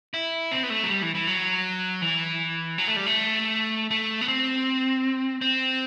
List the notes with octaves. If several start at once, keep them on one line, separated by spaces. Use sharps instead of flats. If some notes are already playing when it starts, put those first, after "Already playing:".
E4
C4
B3
A3
F#3
G3
E3
E3
F#3
E3
F#3
A3
G3
A3
A3
B3
C4
C4